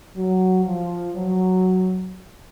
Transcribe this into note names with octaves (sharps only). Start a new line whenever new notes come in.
F#3
F3
F#3